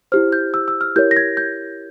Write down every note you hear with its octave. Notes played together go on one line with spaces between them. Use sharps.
E4 G4 C5 F6
G6
E6
E6
F6
E4 G4 A#4 C#5 G6
A#6
G#6
G6